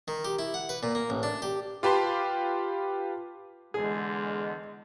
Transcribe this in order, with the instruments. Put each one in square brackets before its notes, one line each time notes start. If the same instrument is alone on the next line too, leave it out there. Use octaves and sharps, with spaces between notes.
[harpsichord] D#3
G4
E4
F#5
B4
A#2
A#3
A1
D4
G4
[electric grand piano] F4 G4 B4 A5 C6
[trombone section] E2 D3 [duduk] G#3 [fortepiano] G#4